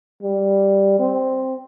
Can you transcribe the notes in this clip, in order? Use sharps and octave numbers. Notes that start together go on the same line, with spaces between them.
G3
C4